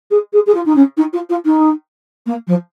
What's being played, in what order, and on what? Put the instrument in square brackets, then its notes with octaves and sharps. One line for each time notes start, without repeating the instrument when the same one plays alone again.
[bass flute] G#4
G#4
G#4
F4
D#4
C#4
D#4
F4
F4
D#4
A#3
F3